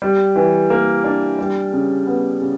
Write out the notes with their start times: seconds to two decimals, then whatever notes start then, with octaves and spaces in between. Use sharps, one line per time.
0.02 G3
0.36 E3
0.70 A#3
1.04 D4
1.39 G3
1.73 C#3
2.07 B3
2.41 C#3